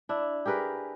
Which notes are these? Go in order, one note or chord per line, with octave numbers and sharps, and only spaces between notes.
D4 E4
G4 G#4 A#4 B4